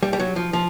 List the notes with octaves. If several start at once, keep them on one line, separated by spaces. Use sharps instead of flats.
G3
G3
F#3
F3
F3